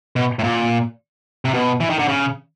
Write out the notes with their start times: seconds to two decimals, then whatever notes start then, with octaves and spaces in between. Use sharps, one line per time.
0.16 B2
0.39 A2
0.43 A#2
1.45 C3
1.54 B2
1.80 E3
1.90 D#3
1.99 D3
2.08 C#3